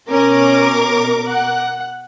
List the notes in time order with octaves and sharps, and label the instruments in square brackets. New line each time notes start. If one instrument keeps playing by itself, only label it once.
[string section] B2 A#4 D6 [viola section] C#4
[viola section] F#5